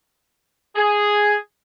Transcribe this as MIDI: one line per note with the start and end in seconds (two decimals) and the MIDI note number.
0.76 1.35 68